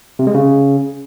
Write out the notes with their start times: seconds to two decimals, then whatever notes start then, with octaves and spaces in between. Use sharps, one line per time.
0.19 C3
0.27 G#3
0.35 C#3